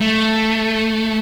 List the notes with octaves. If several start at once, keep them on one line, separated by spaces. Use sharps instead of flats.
A3